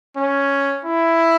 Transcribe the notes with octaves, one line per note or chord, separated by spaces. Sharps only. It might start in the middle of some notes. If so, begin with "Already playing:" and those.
C#4
E4